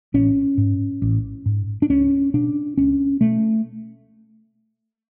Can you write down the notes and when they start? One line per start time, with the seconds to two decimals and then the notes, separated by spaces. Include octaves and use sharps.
0.14 A1 C#4
0.58 G#2
1.02 A1
1.46 G#2
1.82 D4
1.89 C#2 C#4
2.34 B2 D4
2.78 C#2 C#4
3.21 B2 A3